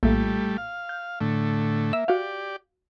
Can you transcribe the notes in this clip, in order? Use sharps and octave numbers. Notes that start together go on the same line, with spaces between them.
A#1 A2 G3 A3
F5
G6
A2 D3 A3
A#3 E5
F#4 G4 D5 F5